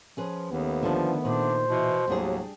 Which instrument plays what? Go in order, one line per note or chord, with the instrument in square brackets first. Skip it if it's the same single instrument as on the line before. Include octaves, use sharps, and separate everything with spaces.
[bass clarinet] F3 [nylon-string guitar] C#4 G#4 B4
[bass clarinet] D#2 [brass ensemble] D#3 A3 B3
[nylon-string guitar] D3 D4 [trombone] F3
[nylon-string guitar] A#2 [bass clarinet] D4 [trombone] C5
[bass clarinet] B2 [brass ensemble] E3
[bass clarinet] D#2 [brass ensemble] A2 C3 F#3 [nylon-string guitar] G3 D4 G#4